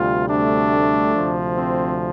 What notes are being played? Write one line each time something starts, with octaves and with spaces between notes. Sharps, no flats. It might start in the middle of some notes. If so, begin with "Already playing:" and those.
Already playing: D2 C3 G3 F4
A3 D4
D2 C3 F3
C4